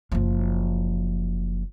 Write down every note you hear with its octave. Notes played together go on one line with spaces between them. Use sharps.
F#1 F3